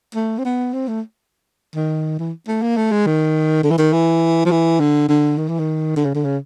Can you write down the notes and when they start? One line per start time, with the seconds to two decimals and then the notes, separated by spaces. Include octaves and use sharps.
0.15 A3
0.38 C4
0.45 B3
0.74 C4
0.88 A3
1.75 D#3
2.19 E3
2.47 A3
2.62 A#3
2.77 A3
2.91 G#3
3.06 D#3
3.63 D3
3.71 E3
3.78 D#3
3.93 E3
4.45 F3
4.51 E3
4.80 D3
5.08 D3
5.38 D#3
5.48 E3
5.59 D#3
5.96 D3
6.05 C#3
6.15 D3
6.24 C#3